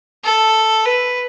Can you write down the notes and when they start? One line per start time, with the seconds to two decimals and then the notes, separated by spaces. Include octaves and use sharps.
0.24 A4
0.86 B4